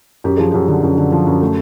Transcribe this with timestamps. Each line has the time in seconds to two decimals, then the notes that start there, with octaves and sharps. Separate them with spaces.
0.24 F#2 G4
0.37 F3 G#4
0.51 F#2 G4
0.68 D3
0.83 F#2
0.97 D3
1.12 F3
1.26 F#2
1.41 A3